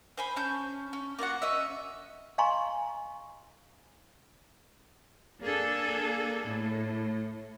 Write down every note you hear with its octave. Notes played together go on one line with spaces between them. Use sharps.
C5 G#5 B5
C#4 A5 G6
C#4
A#3 F4 F#4 F#5
C#4 D#5 E5
D#5 F5 G#5 A#5 C6 C#6
A#3 D4 G#4 A4
A2